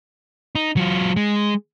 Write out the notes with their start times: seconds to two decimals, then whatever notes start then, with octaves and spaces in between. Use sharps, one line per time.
0.55 D#4
0.77 F#3 F4
1.16 G#3